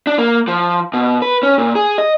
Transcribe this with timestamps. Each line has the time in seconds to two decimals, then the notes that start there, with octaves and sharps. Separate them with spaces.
0.07 D4
0.19 A#3
0.48 F3
0.93 B2
1.22 B4
1.43 C#4
1.58 A#2
1.75 G#4
1.98 D#5